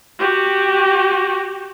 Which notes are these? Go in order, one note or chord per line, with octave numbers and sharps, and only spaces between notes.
F#4 G4